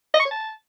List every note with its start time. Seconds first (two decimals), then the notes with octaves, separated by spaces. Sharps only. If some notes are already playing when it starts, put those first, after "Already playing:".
0.14 D#5
0.20 C#6
0.25 C#5
0.31 A5